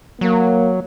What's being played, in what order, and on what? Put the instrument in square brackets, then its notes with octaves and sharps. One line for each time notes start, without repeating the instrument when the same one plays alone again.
[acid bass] F#3 [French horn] A#3